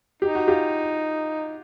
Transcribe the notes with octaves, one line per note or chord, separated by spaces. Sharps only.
D#4 G4
F#4
F4 G4